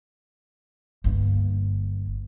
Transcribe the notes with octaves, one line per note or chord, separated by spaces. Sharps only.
G1 A#3